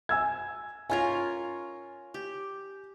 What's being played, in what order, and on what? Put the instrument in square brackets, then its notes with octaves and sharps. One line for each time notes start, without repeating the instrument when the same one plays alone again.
[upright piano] G#5 E6 G#6
[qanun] C#4 F4 A#4 [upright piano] G#5 G#6
[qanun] G4